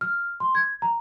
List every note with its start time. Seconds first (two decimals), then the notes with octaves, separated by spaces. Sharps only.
0.01 F6
0.40 C6
0.55 G#6
0.82 A#5